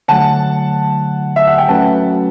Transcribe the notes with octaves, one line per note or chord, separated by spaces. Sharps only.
D3 F#3 A3 F#5 A5
E5
F#5
G5
F#3 A3 C#4 F#4 B4 F#5 A5